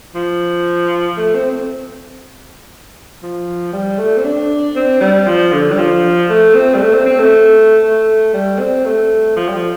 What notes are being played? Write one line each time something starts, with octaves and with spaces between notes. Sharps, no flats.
F3
A3
C4
C4
F3
G3
A3
C4
D4
C4
G3
F3
D3
G3
F3
A3
C4
G3
A3
C4
C4
A3
A3
G3
C4
A3
F3
G3
F3